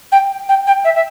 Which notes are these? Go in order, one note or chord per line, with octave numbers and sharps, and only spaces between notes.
G5
G5
G5
E5
E5